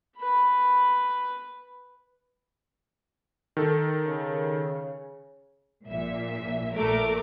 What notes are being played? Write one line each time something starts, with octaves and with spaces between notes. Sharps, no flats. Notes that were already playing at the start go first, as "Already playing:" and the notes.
B4 B5
D#3 A4
C#3
A#1 A#2 E5
A#1 A#2 A3 A#4 D6